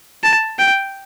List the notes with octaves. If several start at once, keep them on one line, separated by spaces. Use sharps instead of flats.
A5
G5